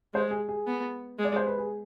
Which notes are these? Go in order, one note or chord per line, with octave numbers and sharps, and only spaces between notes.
G#3 C5
G#4
G#4
B3
G#3
D5
C5
B4
G#4